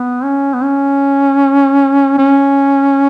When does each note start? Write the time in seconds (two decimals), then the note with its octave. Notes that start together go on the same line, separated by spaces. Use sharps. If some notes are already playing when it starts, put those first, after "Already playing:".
Already playing: B3
0.24 C#4
0.54 B3
0.63 C#4
2.18 C#4